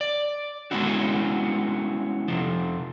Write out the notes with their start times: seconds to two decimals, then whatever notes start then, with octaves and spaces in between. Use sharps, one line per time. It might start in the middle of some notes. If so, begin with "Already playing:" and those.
0.01 D5
0.71 G#3 B3 C#4 E4 F#4
2.28 C3 F3